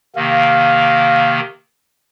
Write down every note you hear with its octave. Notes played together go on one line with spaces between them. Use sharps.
C3 D#3 A#3 F5